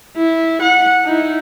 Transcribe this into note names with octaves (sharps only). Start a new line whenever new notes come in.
E4
F#5
D#4 E4